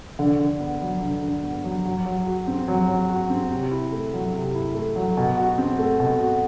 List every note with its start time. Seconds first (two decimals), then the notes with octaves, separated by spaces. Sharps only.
0.19 D3
0.39 D3
0.61 B3
0.81 F#3
1.02 D3
1.23 D3
1.43 B3
1.64 F#3
1.85 F#3
2.05 F#3
2.26 F#4
2.47 C4
2.68 F#3
2.88 F#3
3.09 F#4
3.30 C4
3.51 C3
3.71 E4
3.92 A3
4.13 F#3
4.34 C3
4.54 E4
4.75 A3
4.96 F#3
5.17 B2
5.37 F#4
5.58 C4
5.79 A3
6.00 B2
6.20 F#4